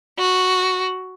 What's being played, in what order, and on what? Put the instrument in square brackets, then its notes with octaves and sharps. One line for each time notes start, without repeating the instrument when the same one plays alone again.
[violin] F#4